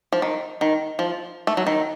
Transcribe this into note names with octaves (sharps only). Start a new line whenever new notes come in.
F3
D#3
D#3
F3
A3
F#3
D#3